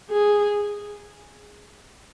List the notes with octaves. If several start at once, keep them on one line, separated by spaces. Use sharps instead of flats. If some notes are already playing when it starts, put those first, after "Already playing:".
G#4